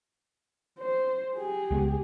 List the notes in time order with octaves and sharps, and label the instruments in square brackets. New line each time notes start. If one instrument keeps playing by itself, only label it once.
[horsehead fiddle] C5
G4 G#4
[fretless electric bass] C#2 G#3 B3